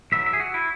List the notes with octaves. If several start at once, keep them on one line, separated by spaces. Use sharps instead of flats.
B1 B2 F#3 E5
E5
G#4
F#4
E4